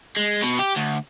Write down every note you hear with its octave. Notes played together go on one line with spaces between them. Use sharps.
G#3
B2
G4
D2